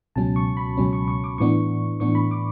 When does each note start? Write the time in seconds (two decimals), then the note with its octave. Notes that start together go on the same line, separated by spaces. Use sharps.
0.16 C#2 B2 F#3 C#4 A5
0.36 C#6
0.57 B5
0.77 C#2 B2 F#3 C#4
0.93 C#6
1.08 C#6
1.24 D6
1.38 A2 E3 B3 D4 C#6
2.00 A2 E3 B3 D4 C#6
2.15 B5
2.31 D6